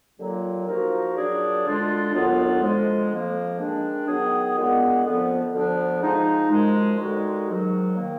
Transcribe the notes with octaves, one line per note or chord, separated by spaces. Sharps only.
D#2 D3 F#3 A#3 F4
F3 A#3 D#4 F#4 A#4
A#2 F#3 D4 G#4 D5
D2 D3 G#3 D4 F4
D#2 D3 F#3 B3 F4
D3 F3 G#3
F2 F3 A#3
D#3 G#3 D4
D#3 F#3 B3 D#4 G#4
A#2 G#3 B3 D4
F2 D3 F3 B3
D2 D3 F3 B3 D4
F3 G#3 D#4
F#2 F3 G#3
D#2 D3 G#3 D#4 F#4
G#2 D#3 F#3
D#3 A#3